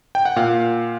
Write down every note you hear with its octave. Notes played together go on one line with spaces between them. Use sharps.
G5
F#5
A#2 F5